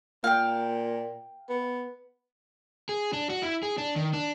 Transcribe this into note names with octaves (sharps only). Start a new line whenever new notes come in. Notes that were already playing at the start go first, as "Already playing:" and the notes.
A#2 F5 G5
B3
G#4
D4
F#4
E4
G#4
D4
D#3
D4